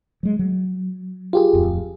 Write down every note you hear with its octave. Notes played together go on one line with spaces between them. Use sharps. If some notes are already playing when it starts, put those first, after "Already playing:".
F#3 G#3
F#3
F4 G4 G#4
D1 F2